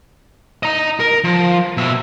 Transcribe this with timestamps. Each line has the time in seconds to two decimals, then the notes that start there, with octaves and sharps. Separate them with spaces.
0.63 D#5 A#5
1.00 A#4
1.24 F3
1.77 B2 E5